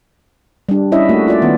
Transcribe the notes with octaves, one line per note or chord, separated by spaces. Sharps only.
G3 D4
C#4 E4 C#5 D#5 E5
A3 A#3 F#4
F4 D5
D#3 B3